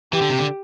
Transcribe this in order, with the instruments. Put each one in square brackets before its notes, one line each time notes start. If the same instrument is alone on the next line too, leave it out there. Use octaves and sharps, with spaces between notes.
[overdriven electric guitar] E3 [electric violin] G4
[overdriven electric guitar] D3
C3
D3